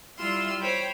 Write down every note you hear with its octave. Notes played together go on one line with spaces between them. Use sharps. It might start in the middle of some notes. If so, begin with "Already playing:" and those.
G3 E4 F4 C6 E6
C5 C#5 G5 B5